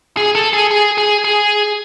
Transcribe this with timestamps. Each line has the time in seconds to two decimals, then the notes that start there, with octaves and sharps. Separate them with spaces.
0.17 G#4
0.35 A4
0.53 G#4
0.71 G#4
0.98 G#4
1.24 G#4